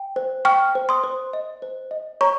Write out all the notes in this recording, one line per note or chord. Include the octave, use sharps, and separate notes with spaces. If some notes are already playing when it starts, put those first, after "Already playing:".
Already playing: G5
C5
G5 C#6 F6
C5
C6 D#6
C5
D#5
C5
D#5
C#5 A#5 C#6